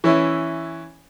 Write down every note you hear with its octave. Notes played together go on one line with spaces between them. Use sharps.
E3 C#4 E4